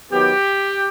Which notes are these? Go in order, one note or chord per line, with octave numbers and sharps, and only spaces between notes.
D#3 F#3 B3 G4